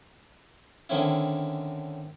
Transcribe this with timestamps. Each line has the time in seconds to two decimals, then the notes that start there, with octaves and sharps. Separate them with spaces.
0.89 D3 D#3 C4 C#4 E4